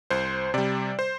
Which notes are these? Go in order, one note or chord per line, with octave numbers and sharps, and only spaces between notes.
C2 C5
C3 G3 D5
C5